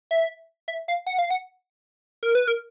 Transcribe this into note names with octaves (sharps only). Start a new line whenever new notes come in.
E5
E5
F5
F#5
F5
F#5
A#4
B4
A#4